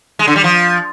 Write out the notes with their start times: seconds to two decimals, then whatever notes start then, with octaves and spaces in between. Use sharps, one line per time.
0.19 G#3
0.28 D3
0.36 G3
0.44 F3